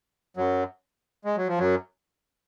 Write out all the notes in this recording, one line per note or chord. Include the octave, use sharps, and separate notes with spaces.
F#2 F#3
G#3
F#3
F3
F#2 F#3